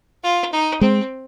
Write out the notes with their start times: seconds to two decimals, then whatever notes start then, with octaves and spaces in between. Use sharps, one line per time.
0.23 F4
0.52 D#4
0.81 G#3 C4